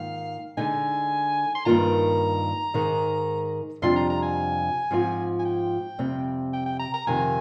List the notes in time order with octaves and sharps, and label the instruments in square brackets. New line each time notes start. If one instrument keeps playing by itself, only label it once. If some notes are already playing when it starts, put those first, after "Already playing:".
Already playing: [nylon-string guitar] G#2 D#3 A#3 F4 [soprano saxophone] F5
[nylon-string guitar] D3 G#3 D#4 [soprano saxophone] G#5
[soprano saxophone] C6
[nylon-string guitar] G2 D#3 A#3 F4 [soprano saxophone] A#5
[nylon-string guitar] G#2 D#3 G#3
[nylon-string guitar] F2 C3 G3 D4 F4 [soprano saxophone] C6
[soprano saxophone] A#5
A#5
G#5
[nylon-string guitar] G#2 F3 C4 F4
[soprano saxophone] G#5
G5
[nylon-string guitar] F2 C3 G3 C4
[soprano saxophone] G5
G5
A#5
A#5
[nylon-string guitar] F2 C3 D#3 [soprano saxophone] G#5